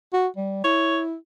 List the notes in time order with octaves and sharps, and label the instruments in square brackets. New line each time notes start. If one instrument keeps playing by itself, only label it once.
[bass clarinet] F#4
G3
[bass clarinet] E4 [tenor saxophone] C#5